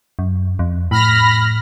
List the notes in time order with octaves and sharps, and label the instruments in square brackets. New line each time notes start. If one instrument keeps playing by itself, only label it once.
[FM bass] F#2
F2
[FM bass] A2 [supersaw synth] B5 F6 A#6